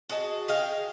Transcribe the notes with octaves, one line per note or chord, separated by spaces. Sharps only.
F#4 G#4 D#5 A5
G#4 D#5 F5 G5